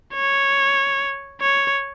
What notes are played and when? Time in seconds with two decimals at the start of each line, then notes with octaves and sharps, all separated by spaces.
0.14 C#5
1.41 C#5